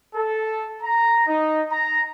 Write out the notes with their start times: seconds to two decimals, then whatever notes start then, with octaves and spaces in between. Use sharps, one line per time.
0.15 A4
0.83 A#5
1.28 D#4
1.72 A#5